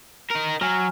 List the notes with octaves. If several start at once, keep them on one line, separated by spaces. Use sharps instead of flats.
D#4 A#4
F#3 G#5 A#5 F6